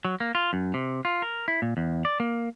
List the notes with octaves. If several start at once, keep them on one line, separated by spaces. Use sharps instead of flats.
F#3
A#3
F4
F#2
C3
F4
A#4
E4
A#2
E2
D5
A#3